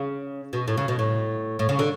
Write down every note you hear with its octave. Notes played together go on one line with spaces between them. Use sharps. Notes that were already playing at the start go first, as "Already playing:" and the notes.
Already playing: C#3
B2
A2
C#3
B2
A2
A2
C#3
D3